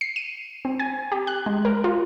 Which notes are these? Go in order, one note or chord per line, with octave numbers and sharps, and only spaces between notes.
C7
D#7
C4
G#5
G4
F#6
G#3
A#4
F4